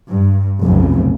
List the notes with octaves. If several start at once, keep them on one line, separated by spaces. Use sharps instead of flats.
G2
F1 B1 C#3